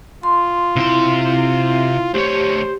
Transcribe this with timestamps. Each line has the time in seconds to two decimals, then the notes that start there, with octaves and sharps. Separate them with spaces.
0.23 F4 C6
0.76 C3 E4 C6
2.14 D2 G4 C5 C#5